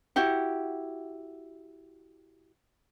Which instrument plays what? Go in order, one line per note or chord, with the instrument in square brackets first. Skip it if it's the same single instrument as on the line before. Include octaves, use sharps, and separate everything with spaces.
[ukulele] E4 F#4 G4 F#5